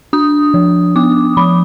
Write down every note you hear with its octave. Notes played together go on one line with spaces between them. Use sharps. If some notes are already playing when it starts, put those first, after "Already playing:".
D4 D#6
F3
B3 D6
F3 B5